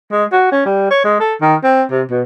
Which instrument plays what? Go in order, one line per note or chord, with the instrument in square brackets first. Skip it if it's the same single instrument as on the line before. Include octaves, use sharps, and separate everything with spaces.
[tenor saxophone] G#3
F#4
C#4
G3
C#5
G#3
A4
D#3
C4
C3
B2